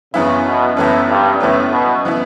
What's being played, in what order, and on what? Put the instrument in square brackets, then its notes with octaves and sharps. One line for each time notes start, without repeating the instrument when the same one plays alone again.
[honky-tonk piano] F#2 E3 B3 E4 [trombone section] C#3
[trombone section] B2
[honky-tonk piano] F#2 E3 B3 E4 [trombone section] A2
[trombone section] G2
[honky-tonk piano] F#2 E3 B3 E4 [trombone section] A2
[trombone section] B2
[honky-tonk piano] E3 B3 E4